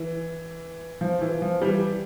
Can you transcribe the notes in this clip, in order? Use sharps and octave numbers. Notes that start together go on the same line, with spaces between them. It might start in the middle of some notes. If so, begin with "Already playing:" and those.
Already playing: E3
F3
E3
F3
E3 G3